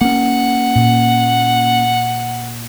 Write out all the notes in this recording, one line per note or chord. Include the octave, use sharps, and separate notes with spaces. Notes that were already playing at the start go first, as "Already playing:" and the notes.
A#3 C#4 F#5
A#2